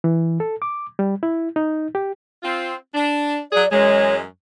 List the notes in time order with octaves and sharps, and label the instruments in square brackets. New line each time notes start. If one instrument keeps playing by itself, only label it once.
[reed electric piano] E3
A4
D6
G3
E4
D#4
G4
[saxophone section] C4 F4
D4
[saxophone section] F#3 G#4 [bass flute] D5
[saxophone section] F#2 E3 G#3 [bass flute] C#5